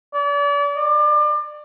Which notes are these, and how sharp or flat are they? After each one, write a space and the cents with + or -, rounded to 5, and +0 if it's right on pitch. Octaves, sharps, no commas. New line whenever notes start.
D5 -40
D5 +30